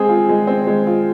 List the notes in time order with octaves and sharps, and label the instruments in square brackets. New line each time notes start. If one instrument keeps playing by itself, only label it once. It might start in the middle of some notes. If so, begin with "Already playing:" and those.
Already playing: [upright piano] G#3 C4 [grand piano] G#4
[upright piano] F4
G#3
C4
G#3
F4